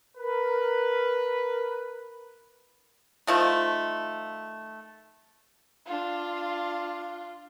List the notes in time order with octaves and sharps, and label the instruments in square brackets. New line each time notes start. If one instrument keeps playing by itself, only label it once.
[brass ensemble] A#4 B4
[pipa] D#3 F3 A3
[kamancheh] D4 F4